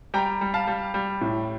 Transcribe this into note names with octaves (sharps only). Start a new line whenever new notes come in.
G3 G5 A#5
G3
F5 A5
G3
G3
A2